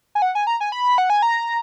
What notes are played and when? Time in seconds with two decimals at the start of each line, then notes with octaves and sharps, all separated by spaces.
0.15 G#5
0.22 F#5
0.35 G#5
0.47 A#5
0.60 G#5
0.72 B5
0.98 F#5
1.10 G#5
1.22 A#5